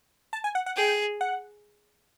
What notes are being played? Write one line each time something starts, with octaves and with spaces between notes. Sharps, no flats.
A5
G#5
F#5
F#5
G#4 G5
F#5